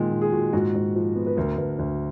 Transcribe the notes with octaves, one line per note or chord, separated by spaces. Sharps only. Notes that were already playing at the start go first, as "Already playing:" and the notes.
Already playing: A#2 D#3 G#3
A#2
G#4
A#2 F#4
G#2 F#4
G#2
F3
B3
B4
D2 A#4
D2 B4
D2